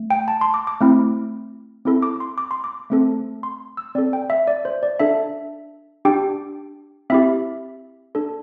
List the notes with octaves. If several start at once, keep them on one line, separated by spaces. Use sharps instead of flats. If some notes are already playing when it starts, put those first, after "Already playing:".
Already playing: A3
G5
A5
C6
D6
D6
A3 C4 E4
C4 E4 A4
D6
C6
D6
C6
D6
A3 C4 A4
C6
E6
C4 A4 D5
G5
E5
D5
C5
D5
D4 A4 E5
D4 G4 G5
C4 E4 G4 E5
D4 A4